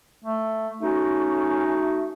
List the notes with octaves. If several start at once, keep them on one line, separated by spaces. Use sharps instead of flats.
A3
A3 C#4 D#4 F#4